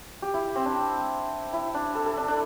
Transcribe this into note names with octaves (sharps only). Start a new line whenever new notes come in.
G4
E4
C4
D4
E4
D4
A4
A4
D4
D4